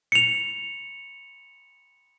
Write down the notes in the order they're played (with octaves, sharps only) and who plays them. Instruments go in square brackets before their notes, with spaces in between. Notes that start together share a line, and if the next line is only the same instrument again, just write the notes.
[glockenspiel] C#7 F7